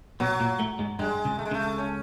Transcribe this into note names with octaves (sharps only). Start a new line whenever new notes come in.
B2 F#3 B3
A#2 A#3
A2 A3
G#2 G#3
G2 G3 G#3
C#2 C#3
A3
G#3
C#2 C#3 A3
C#4